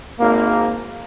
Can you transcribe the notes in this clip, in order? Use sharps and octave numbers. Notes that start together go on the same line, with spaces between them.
G#1 A#3